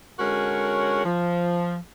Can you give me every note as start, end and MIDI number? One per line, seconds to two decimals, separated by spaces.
0.19 1.01 50
0.19 1.01 56
0.19 1.01 61
0.19 1.01 66
0.19 1.01 70
0.19 1.01 73
1.05 1.76 53